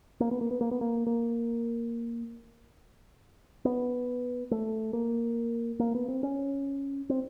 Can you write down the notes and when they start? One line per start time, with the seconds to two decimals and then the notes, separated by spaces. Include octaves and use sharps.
0.20 A#3
0.31 B3
0.41 A#3
0.51 B3
0.61 A#3
0.71 B3
0.81 A#3
1.06 A#3
3.65 B3
4.51 A3
4.93 A#3
5.79 A#3
5.95 B3
6.08 C4
6.23 C#4
7.09 C4